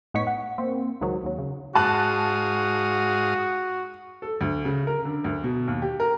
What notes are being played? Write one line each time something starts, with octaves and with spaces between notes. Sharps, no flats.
A2 B3 D#4 C#5 C#6 B6
F#5
A#3 C4
C#2 G#2 D#3 F#3
D#2 F#3
C#3
G#2 F#4 F5 A5 D#6 F#6
A4
D2
C#3
A#4
D3
D2
B2
D#2
G4
A#4